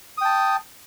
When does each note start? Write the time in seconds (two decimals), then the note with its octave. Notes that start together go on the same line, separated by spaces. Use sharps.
0.18 D#6
0.21 G5
0.25 A5